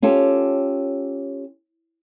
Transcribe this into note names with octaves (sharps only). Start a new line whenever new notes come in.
C#4 F4 G4 A4